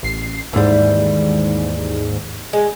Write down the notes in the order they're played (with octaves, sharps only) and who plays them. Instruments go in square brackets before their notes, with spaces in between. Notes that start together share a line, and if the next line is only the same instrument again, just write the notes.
[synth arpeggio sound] A1 C7
[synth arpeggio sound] D#2 G#2 [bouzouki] E3 G3
[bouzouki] G#3